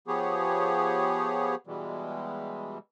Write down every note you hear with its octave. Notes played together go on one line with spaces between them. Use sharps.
F3 B3 G4 G#4 C#5
B2 E3 G3 G#3